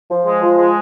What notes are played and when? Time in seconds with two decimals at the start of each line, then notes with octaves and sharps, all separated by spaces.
0.09 F3
0.25 G#3
0.41 F3
0.58 G#3